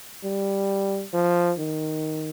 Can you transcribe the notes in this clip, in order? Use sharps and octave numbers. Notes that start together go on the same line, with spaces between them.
G3
F3
D#3